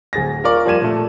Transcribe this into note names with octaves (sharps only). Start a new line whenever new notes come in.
D1 G#4 A6 A#6
F4 A#4 D5 C#6
F3 G3 A#3 G#6 D#7 E7
A#2 A3